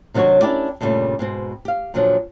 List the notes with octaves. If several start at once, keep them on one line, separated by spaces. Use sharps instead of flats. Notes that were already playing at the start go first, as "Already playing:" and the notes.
C3 D#3 F#3 D4 F#4 C#5
C#4 D4 E4 G4 A#4 D5
G2 A#2 C#3 F3 G3 A3
G#2 B2 C4
G4 F5
A#2 D3 F3 F#3 D4